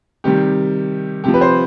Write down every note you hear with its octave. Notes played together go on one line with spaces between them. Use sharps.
C3 D#3 G3 G4
C3 F3 G4
B4
C5